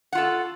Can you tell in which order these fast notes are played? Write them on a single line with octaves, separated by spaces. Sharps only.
F#5 F4 A4